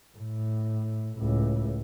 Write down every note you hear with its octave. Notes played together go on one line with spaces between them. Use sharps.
A2
C#2 A2